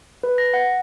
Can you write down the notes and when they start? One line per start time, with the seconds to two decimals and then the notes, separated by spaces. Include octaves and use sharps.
0.23 B4
0.38 A#6
0.54 F#5